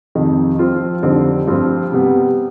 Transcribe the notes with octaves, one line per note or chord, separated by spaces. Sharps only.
F2 C3 D#3
F3 C4 F4
F2 D3 G3 C4 D#4
G2 F3 C4 F4
C3 G3 B3